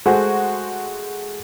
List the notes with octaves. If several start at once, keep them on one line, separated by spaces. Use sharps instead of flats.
G#3 A3 F#4 C5 G#5